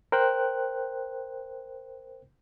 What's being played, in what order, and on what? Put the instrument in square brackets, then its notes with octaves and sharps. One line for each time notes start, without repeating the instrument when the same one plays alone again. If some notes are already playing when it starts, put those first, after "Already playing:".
[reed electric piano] A#4 C5 G5 F#6